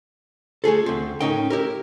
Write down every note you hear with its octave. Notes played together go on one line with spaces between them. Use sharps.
A3 F4 G#4 A4
D2 C4
A2 C#4 D#4 A#4 G5
E4 G4 A#4